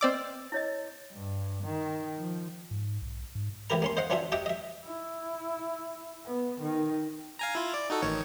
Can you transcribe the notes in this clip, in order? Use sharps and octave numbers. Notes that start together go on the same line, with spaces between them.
C4 B4 D5 D#5 D6 E6
E4 C#5 D#5
G2
D#3
F3
G#2
B1
G#2
A1 E3 E4 G4 A#4 A#5
A#3 C#4 C6
C5 D#5 F5 F#5
E3 C#4 D4 F4 F#4 E5
F#4 G4 D#5 E5 F#5 G5
D#5 E5
E4
B3
D#3
F5 G#5 A#5
E4 F4
D5
D#4 F#4 A4
A1 D#3 C#5